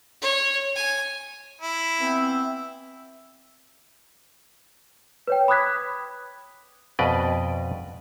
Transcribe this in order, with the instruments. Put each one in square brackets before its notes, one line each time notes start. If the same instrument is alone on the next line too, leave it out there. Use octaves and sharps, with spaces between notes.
[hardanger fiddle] C#5
G#5
[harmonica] E4
[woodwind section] E3 B3 C4 [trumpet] E5
[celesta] B4 C#5 G5
B5 D6 D#6 F#6 G#6 B6
[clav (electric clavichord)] F2 B2 B4 D5 D#5